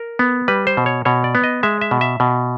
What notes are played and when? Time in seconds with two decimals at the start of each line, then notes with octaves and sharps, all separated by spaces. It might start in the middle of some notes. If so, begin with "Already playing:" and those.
Already playing: A#4
0.19 B3
0.48 G3 B4
0.67 C5
0.77 B2
0.86 C#5
1.05 B2 C#5
1.24 D5
1.35 B3
1.44 D#5
1.63 G#3 E5
1.81 E5
1.91 B2
2.01 E5
2.20 B2